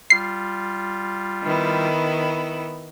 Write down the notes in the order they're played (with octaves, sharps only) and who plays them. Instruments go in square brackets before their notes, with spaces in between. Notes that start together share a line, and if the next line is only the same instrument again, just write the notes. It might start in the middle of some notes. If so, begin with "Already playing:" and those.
[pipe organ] G3 F4 [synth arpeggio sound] C7
[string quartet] D#3 B3 E4